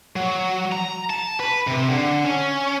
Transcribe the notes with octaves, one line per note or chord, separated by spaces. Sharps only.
F#3
A#5
A5
B4
C3
D3
C#4